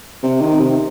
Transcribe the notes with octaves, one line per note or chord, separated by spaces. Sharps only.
C3
D#3
C3